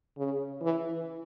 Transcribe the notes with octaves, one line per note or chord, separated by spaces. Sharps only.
C#3
E3